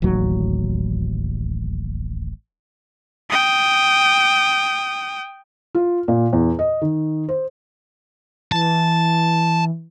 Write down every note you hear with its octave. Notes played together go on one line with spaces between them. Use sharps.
D1 A1 D#2 F#3
G5 D#6
F4
A#2
E2
D#5
D#3
C5
E3 A5